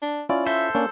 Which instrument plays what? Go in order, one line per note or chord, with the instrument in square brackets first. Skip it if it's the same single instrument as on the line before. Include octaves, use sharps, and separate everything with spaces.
[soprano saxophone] D4
[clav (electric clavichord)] C#4 E4 F4 [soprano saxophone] D5
[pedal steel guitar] A4 C5 [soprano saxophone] E5
[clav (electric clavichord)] A#3 C#4 [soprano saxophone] D4